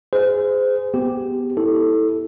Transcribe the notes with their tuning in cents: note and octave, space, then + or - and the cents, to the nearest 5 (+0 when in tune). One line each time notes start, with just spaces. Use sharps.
G#4 +0 C5 -30
B3 +0 G4 +0
E4 -20 A4 +0